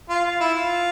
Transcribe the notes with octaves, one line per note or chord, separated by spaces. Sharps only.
F4
F4
E4
F4